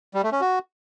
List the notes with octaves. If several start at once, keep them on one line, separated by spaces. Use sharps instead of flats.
G3
A3
C#4
F#4